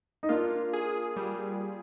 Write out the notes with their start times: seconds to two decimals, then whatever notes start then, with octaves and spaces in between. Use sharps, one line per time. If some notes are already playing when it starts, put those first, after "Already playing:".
0.23 D#4
0.29 A#3 D4 F4
0.73 G#4
1.16 G3